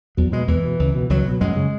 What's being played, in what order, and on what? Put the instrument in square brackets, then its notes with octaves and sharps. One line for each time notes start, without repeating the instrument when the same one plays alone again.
[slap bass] E2 F#3
B2 G#3
E2 E3
B2
C#2
B2
C#2 F#3
B2
F#2 G#3
C#3